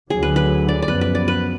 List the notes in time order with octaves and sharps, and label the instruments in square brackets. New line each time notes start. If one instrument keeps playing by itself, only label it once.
[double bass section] D2 D3 F#3 [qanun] G#4
[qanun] B4
B4
D5
D5
[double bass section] F#2 F3 B3 [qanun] B4
[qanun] B4
D5
B4